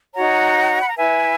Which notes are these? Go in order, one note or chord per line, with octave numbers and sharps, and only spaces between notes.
D#4 F#4 C#5 F#5 A#5
B5
A#5
E4 B4 E5 G#5